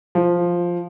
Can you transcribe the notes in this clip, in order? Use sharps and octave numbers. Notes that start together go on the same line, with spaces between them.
F3